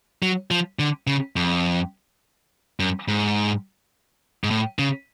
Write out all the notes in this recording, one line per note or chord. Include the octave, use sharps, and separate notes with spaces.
F#3
F3
D3
C#3
F2
F#2
G#2
G#2
A2
C#3